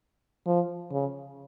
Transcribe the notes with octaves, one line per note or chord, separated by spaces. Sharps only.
F3
C#3